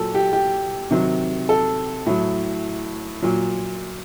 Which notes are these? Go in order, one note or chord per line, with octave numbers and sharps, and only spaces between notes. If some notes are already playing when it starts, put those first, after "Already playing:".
Already playing: A#2 F#3 A4
G4
G4
C3 D#3 F#3
A4
A2 F#3
A#2 F#3